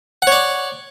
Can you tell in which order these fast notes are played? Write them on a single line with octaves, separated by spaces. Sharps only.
F#5 C#5 D5